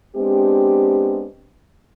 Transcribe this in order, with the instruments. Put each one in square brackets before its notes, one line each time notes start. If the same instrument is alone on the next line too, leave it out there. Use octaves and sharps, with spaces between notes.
[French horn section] G#3 B3 C4 D4 G4